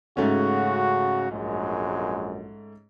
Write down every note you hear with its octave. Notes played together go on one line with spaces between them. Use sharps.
G#2 C#3 A3 C#4 F#4
A#1 F#2 G#3